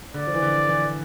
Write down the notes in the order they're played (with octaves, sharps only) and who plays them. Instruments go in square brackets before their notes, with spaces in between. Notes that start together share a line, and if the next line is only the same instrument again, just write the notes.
[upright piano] D3 [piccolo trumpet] D5
[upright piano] F3
E3
D3
E3